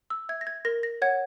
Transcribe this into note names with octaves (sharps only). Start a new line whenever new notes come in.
E6
E5 G#6
A#6
G#6
A#4 A#6
A#6
C#5 F#5 G#6